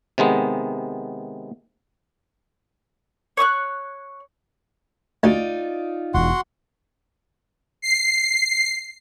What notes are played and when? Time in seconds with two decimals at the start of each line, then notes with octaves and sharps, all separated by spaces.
0.18 C3 D#3 G#3 B3
3.37 C#5 C#6 D#6 F#6
5.23 D2 D#4 F4 D5
6.14 E1 E2 F#4 F#5 C6
7.82 C7